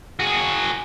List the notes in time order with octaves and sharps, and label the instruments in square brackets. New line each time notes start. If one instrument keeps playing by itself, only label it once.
[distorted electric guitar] F#4 G#4